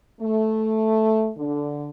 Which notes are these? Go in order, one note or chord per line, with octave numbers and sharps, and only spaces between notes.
A3
D3